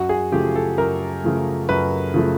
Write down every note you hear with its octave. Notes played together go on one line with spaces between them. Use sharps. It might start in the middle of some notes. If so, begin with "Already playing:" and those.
Already playing: F#2 F#4
G#4
C#3 F3 A3 G4
A4
F#2 A#4
C#3 F3 A3
F#2 B4
C#3 F3 A3